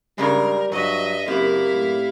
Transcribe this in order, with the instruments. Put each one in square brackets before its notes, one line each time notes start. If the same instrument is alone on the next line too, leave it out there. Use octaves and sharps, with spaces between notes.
[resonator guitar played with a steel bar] G2 C#3 G#3 [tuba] G3 [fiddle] A#4
[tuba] G2 [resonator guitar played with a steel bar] F#3 F#4 [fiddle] D#5 E5
[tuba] F#1 [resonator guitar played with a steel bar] F#2 A#3 [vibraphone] C4 G4 [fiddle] E4 F5
[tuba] A2